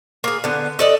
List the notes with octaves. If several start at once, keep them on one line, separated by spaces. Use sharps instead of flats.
A#3 G#4
D3 B3
A4 D5 D#5